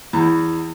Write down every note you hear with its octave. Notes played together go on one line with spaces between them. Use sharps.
E2